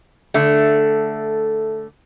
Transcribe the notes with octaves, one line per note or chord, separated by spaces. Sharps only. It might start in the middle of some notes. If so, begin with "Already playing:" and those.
D3 A3